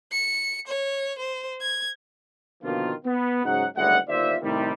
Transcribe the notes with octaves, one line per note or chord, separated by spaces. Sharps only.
C#7
C#5
C5
G#6
B2 D3 D#3 F3 A#3 F4
B3
G#2 C#3 F#3 D#4 F#4 F#5
F#1 D2 G3 G#3 E5 F#5
G1 D#2 F4 C5 D5 E5
A2 C3 D#3 G3